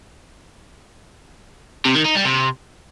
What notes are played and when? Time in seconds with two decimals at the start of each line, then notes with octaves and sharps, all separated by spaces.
1.85 C3
1.95 D#3
2.05 D#4
2.15 G3
2.25 C3